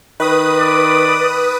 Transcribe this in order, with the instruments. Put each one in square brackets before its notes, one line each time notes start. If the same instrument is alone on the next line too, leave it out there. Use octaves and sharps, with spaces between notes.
[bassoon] D#3 [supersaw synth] B4 D#6
[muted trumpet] D5